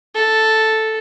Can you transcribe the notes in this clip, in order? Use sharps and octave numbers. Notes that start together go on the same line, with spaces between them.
A4